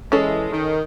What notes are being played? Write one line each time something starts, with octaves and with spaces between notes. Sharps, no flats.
E3 G#3 C#4 A4
D#3